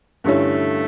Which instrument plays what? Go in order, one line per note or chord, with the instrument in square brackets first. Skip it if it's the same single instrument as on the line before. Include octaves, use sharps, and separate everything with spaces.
[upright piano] G2 D3 G3 C#4 E4 [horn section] A3